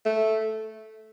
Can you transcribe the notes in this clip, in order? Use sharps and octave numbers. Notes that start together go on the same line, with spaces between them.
A3